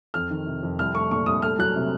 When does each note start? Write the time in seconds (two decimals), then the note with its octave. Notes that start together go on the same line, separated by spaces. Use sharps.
0.14 F2 F6
0.30 D#3
0.46 C3
0.63 F2
0.79 C2 F6
0.94 A3 C#6
1.11 A#2 C#6
1.26 C2 D#6
1.42 A3 F6
1.58 F#3 F#6
1.75 C3